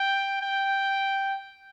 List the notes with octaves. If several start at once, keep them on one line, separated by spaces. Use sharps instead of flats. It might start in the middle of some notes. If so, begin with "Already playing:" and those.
Already playing: G5
G5